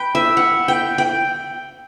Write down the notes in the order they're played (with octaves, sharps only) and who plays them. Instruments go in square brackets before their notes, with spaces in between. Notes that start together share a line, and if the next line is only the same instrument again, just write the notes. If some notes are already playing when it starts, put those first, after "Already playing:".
Already playing: [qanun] B4 G5
E5
F#5
G5
G5